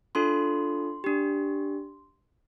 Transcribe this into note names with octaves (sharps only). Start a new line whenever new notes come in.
D4 F4 A4 C6
D4 G4